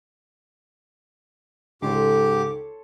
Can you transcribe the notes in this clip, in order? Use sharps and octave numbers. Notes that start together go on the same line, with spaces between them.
C#2 G#2 D#4 G4 A4 C#5 C6 D6